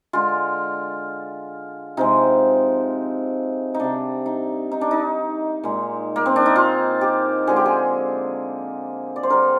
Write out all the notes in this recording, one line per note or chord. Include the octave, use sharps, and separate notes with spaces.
D3 G#3 F4
C3 F3 G#3 D#4
D#4
C3 G3 D4
D#4
D#4
D4
D#4
A#2 G#3
A#3
C4
D4
D#4
F4
G4
D3 F3 G#3 G#4
G4
G#4
D5
C5
D3 G3 A#4